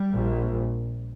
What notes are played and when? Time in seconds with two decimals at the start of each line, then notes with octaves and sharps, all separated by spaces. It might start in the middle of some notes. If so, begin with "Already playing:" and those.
Already playing: G3
0.11 A#1 A#2